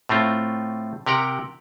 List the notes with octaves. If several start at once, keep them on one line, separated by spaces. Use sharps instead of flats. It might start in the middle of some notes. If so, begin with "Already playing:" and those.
A2 A3 C4 F4
C3 G4 A#4 F#5 G5